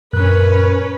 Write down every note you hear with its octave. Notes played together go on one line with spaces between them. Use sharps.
F#2 A#2 C#4 A#4 B4 F#6